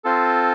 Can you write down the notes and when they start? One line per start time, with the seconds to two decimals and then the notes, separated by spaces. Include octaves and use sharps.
0.04 C4 F4 A4